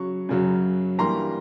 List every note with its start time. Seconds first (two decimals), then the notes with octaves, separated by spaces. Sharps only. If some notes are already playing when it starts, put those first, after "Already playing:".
Already playing: C#3 F#3 C#6
0.29 F#2 C#3 F#3
0.98 G2 E3 G3 A#3 A#5 C6